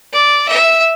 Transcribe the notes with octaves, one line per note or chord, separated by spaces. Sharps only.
D5
E5